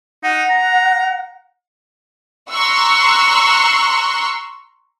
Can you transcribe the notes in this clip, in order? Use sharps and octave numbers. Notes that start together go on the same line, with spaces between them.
D#4 F#5
A#5
A#5 C6 C#6 E6 F#6